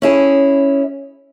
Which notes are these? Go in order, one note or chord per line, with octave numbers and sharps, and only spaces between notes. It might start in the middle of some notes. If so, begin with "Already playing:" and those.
C#4 E4 G#4